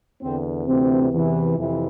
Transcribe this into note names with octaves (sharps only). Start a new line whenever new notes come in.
E2 D3 C4
D2 C3 E3 C4
E2 C3 E3
F2 C3 E3